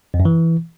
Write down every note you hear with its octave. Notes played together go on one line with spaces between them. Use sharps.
F2
F#2
E3